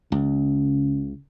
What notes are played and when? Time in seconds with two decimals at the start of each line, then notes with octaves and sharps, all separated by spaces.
0.12 C#2 C#3